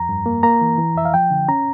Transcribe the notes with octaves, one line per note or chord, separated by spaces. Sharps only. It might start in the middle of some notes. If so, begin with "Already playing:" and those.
Already playing: F2 A#5
G2
A#3
A#3 A#5
E3
E3
F2 E5
F5
F3 G5
D3
C#4 A#5